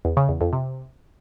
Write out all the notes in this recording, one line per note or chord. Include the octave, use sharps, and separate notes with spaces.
E2
C#3
E2
F2
C3